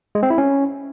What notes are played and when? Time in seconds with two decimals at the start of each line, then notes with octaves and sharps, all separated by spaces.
0.15 G#3
0.23 C4
0.30 E4
0.38 C#4